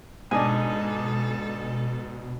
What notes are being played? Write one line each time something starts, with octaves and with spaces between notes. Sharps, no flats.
G#2 B2 G#3 D4 A4 D#5 G#5